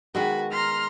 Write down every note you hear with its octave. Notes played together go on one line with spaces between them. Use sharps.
D#3 G#3 B3 F#4 B5
A#5 C6 F6